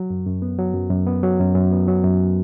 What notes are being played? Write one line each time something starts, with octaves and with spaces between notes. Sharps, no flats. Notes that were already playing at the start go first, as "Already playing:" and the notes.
Already playing: F#3
F#2
F#2
B3
F#3
F#2
F#2
B3
F#3
F#2
F#2
B3
F#3
F#2